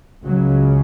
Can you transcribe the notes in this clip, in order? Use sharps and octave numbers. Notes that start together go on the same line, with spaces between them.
C#2 C#3 F#3